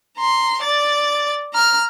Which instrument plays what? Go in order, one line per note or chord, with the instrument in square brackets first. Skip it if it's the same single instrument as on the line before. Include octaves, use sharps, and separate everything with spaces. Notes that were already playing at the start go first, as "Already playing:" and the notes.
[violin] A#5 C6
D5 A6
A#5 F6